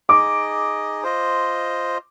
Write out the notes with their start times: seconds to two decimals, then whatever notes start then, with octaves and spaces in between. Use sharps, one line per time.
0.09 D#4 G#4 D#5 D6
1.04 F4 C5 D#5